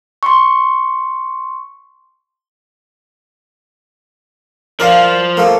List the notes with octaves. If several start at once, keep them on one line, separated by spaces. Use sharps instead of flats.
C6 C#6
F3 A#4 D5 F5
A3 A#3